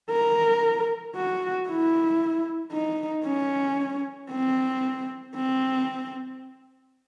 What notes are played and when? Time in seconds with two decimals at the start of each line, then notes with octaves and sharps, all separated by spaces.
0.11 A#4
1.16 F#4
1.69 E4
2.72 D#4
3.25 C#4
4.31 C4
5.35 C4